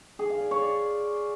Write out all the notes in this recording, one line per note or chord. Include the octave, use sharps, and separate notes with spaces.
G#4
F5
D5
C#5
D5